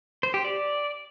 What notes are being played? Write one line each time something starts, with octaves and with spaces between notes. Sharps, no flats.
C5
G4
D5